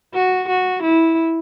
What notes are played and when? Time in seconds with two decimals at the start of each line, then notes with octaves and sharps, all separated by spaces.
0.14 F#4
0.49 F#4
0.82 E4